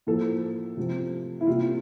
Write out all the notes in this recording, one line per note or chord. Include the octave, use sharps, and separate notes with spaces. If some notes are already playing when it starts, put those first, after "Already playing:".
A2 F3 A#3 A4
C3 F3 A3
E4
C3 G3 A#3 F4